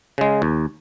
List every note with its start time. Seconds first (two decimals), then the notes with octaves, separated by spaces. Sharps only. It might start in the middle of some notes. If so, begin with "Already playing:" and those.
0.18 C#3 G#3
0.42 D#2